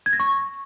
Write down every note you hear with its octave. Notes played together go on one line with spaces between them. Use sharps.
G#6
A#6
C#6